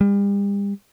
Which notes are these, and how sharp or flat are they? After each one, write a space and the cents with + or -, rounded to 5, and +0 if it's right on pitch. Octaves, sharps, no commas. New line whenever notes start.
G3 +40